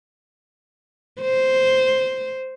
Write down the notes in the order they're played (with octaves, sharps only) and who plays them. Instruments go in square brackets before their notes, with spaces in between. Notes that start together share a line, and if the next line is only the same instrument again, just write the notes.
[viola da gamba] C5